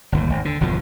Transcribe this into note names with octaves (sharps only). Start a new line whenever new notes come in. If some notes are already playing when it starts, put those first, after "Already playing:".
G1 D#2 A2
G#1
D3
G1 E2 B2 F3